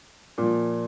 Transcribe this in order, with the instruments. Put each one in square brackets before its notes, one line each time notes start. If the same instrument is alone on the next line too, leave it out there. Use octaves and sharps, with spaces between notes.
[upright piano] A#2 F3